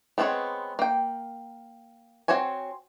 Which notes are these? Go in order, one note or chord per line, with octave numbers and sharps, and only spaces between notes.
G#3 B3 C4 A4 C#5
A#3 G5
C4 F#4 C5 C#5 G#5